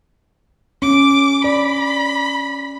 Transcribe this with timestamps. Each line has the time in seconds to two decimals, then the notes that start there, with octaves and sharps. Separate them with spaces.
0.82 C#4 D6
1.44 D5 B5